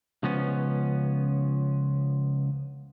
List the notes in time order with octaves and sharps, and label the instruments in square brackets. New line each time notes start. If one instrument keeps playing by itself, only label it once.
[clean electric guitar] C#2 F3 B3 C#4